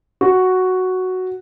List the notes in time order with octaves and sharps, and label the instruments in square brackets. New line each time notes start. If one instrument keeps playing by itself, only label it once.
[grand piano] F#4